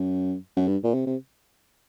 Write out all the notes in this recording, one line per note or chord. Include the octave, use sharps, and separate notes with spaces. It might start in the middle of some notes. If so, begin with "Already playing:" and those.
Already playing: F#2
F#2
G2
A#2
C3
C3